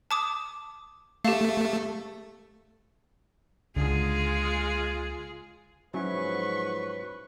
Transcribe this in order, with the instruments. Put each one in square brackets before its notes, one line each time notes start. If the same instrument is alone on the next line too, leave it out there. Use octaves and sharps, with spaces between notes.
[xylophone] A5 D6 D#6
[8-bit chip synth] A3 [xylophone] G4 F5
[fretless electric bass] C#2 D3 [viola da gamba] G#3 F4 G#4
[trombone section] G#2 F3 C5 [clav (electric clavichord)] F#3 C#4 E4 [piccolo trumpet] B4 [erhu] C#6